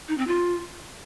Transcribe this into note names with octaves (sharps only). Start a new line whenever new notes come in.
D#4
C4
F4